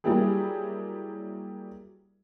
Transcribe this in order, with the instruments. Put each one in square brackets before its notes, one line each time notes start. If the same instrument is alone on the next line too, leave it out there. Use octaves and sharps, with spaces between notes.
[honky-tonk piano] F#3 G3 A#3 E4 G4 G#4